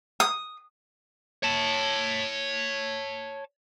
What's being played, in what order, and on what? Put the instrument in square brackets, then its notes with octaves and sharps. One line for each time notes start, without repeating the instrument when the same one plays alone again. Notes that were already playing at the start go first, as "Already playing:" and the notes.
[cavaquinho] D#6
[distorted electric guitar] C#5 A5